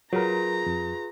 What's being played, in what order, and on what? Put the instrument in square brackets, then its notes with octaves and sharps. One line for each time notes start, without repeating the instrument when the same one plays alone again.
[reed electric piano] F#3 A#4 [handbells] F4 G#4 B4 [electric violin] A#5
[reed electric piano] F2